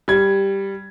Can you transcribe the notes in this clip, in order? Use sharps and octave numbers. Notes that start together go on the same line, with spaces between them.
G3 G#6